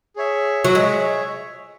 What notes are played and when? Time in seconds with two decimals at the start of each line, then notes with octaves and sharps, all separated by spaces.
0.16 G#4 C#5 E5
0.64 F#3
0.75 G#3 G#4 C#5 E5